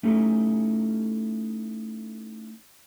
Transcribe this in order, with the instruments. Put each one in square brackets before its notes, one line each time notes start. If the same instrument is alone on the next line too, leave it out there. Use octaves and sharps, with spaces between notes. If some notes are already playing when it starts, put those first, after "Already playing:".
[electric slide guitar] A3 C#4 D#4 E4 G4 A4